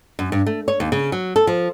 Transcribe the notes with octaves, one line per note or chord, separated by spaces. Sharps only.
F#2
G2
A3
C#5
D#2
C#3
F#3
A4
F3